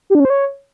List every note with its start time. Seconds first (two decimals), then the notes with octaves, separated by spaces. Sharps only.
0.10 G4
0.15 D4
0.20 C#4
0.25 C5
0.30 C#5